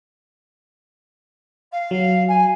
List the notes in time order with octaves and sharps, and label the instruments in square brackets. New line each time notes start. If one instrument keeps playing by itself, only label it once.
[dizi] F5
[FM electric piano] F#3
[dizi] G#5